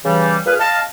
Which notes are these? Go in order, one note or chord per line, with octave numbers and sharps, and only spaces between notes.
C#3 E3 G3
A#2 G#4 B4 F6
D#5 F5 A5